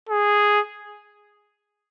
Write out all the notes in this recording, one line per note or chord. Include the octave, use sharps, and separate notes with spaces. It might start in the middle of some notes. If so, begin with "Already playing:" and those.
G#4